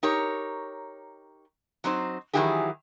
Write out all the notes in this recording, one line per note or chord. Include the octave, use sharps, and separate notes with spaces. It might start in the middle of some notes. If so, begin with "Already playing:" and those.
D#4 G4 A#4 C#5
F#3 C4 D#4 C5
D#3 E3 F#3 E4 G4 G#4